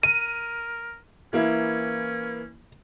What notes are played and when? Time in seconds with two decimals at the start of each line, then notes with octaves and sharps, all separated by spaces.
0.03 A#4 D#7
1.33 E3 A#3 C#4 E4